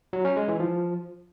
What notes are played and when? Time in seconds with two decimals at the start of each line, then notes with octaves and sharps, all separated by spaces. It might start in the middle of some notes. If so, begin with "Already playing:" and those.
0.13 F#3
0.25 C#4
0.36 G#3
0.48 E3
0.60 F3